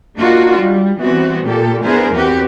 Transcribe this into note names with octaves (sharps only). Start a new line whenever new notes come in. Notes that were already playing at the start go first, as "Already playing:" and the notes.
A#3 D4 D#4 F4 F#4
G3
E3 G3 B3 C4 F#4
A#2 A3 G4 A4
B3 D4 E4 G#4 A#4 C5
E2 C4 F#4 G4 B4